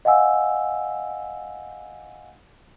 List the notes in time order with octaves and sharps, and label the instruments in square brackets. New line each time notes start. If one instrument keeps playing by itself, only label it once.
[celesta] D#5 F5 F#5 G#5 E6